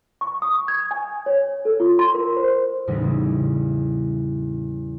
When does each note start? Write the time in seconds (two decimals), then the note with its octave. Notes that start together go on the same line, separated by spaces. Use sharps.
0.21 C#6
0.42 D#6
0.68 G#6
0.91 G#5
1.26 C#5
1.65 A4
1.80 F4
1.99 C6
2.14 A#4
2.36 C5
2.87 E2 A2 C#3 G3 D#4